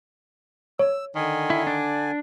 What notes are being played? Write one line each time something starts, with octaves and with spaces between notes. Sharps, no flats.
C#5 E6
D3 D#3 G#5
E4
D4